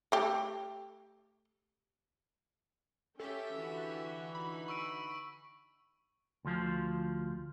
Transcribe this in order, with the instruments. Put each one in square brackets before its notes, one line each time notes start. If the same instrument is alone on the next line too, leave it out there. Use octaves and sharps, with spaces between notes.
[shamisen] A3 G4
[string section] C#4 G5 [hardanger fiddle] G4 E5 [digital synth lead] A4
[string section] D3 E3 F#4
[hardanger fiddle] D#4 [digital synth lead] B5
[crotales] C#6 E6 D7
[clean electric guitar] D2 F3